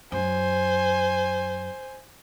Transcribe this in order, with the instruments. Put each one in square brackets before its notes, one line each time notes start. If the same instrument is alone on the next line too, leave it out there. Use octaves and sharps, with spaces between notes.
[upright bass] F#2 [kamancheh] C5 G#5